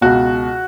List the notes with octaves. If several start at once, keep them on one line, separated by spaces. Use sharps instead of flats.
C#2 B2 F#4